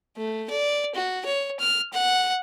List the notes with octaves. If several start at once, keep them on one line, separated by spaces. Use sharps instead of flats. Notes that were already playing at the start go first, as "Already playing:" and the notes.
A3
D5
F#4
C#5
F6
F#5